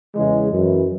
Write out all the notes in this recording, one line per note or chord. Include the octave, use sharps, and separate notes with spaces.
E2 C#3 E3 G#3
F#2 E3